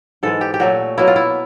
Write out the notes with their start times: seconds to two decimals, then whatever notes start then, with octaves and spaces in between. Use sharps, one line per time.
0.23 G#2 E3 G#3 A4
0.41 G4
0.54 G4
0.60 A#2 F#3 A3 F#4
0.98 B2 F#3 A#3 E4
1.07 F4
1.16 E4